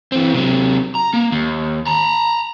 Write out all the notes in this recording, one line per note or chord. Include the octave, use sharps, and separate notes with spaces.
E3 C4
C3 F#3
A#5
A#3
D#2
A5 A#5